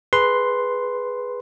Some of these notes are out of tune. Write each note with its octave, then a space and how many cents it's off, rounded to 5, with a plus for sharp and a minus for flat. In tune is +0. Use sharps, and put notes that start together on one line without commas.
G#4 +0 B4 +0 C6 +0